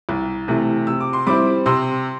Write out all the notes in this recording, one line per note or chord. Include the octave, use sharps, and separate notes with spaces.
C2
C3 E3 A3
C3 E6
D6
C6
G3 C4 E4 B5 D6
C3 C6 E6